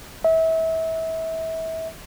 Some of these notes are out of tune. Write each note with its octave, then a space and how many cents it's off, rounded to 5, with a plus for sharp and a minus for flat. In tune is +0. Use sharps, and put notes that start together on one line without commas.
E5 -30